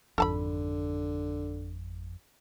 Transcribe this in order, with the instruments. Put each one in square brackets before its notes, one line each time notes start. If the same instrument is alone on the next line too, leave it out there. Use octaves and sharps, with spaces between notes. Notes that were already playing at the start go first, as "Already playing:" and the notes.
[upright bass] G#1 F4 [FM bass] F2 [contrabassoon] D3 [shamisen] A4 A5 B5